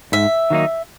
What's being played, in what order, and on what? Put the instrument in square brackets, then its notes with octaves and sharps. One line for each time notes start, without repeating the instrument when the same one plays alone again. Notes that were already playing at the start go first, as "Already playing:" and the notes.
[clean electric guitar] G#2 [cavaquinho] E5
[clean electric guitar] D#3 F#3 A#3 D#4